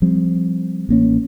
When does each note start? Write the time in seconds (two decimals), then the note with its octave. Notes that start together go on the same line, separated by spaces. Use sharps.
0.02 F3 G3 C4
0.89 A1 A#3 C#4